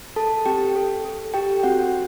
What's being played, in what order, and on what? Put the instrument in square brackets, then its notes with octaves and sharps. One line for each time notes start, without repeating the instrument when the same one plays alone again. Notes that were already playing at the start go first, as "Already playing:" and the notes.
[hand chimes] A4 A5
C4 G4 G5
A4
A4
G4 A4 G5
C4 F#4 F#5